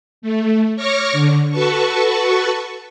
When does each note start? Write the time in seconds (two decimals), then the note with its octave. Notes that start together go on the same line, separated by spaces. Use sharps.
0.22 A3
0.76 C#5 C#6 D6 F6 A#6
1.12 D3
1.51 F#4 A4 B4 A5 C#6